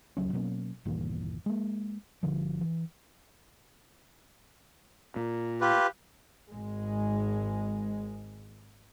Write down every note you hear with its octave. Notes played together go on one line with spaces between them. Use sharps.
E1 C#2 F#3 C#4
B2 F#3 A#3 C#4
G1 D#2 A#2 E3
G#3 A#3
G1 D3 F3
E3
A#2
F4 G4 B4
G#1 G#3